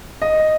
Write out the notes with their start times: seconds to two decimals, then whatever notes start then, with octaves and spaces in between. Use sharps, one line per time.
0.22 D#5